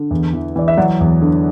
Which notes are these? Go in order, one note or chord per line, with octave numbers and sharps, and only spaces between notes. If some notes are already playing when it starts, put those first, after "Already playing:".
Already playing: D3
E2
E3
E3 D5
E5
F#3 D5 F#5
E2
D3